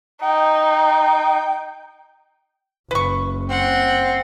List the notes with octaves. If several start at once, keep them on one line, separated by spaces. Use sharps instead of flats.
D#4 G5
F#1 B4 C#6
C4 F#5